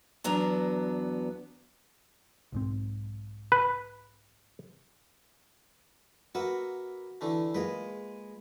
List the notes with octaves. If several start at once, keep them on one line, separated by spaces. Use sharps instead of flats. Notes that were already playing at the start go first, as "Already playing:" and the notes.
E2 F#3 B3 D4 A#5
B1 G#2 C4
B4
A#3 F#4 B4 E5
D3 E3 A3
G#3 A#3 F4 B4 D#5